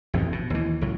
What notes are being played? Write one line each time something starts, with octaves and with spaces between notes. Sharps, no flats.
A1 F2 G#2 B2
B2
D#2 E3
C#2 A2 F#3